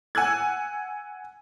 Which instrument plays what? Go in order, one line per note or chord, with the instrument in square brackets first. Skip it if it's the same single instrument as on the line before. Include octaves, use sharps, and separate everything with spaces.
[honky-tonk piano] F#5 G#5 E6 F#6 G#6